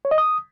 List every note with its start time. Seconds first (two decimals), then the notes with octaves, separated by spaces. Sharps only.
0.05 C#5
0.11 D#5
0.18 D#6